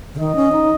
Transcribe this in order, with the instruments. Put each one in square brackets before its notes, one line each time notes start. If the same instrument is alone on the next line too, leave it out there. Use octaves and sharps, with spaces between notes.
[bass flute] C#3
[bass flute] D#3 [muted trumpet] D#5
[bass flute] C#4
D#4